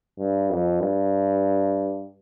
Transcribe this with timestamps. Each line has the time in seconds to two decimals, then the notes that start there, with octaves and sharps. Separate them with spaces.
0.18 G2
0.50 F2
0.80 G2